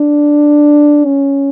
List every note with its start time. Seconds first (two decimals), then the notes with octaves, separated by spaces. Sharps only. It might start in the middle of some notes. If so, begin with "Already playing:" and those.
Already playing: D4
1.06 C#4